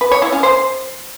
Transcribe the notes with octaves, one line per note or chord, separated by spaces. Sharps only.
B4
C#5
E4
C#4
C5